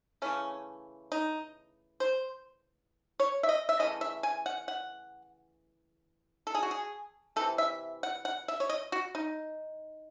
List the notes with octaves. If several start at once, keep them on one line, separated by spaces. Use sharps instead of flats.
C#3 E3 A3 C#4
D#4
C5
C#5
E5
D#5
E5
C#3 E3 A3 D#5
E5
G#5
F#5
F#5
A4
G#4
F#4
G#4
C3 E3 A3 A4
E5
F#5
F#5
E5
C#5
D#5
F#4
D#4